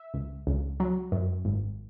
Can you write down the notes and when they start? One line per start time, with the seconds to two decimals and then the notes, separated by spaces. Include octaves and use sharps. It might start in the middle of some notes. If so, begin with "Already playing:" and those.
Already playing: E5
0.14 C#2
0.47 C#2
0.80 F#3
1.12 F#2
1.45 G#1